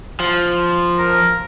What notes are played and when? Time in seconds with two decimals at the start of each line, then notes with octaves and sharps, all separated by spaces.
0.20 F3
0.98 A#4